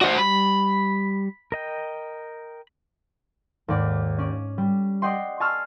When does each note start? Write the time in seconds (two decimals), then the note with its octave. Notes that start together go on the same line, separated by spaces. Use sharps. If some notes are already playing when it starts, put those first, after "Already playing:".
0.01 F#4 C5 D5 D#5 F#5
0.18 G3 B5
1.52 A#4 D#5 G5
3.68 D#2 G#2 D5
4.18 C#4 D5
4.58 G3
5.02 D5 D#5 F#5 G5 C6
5.40 G#5 A5 C6 C#6 E6 F6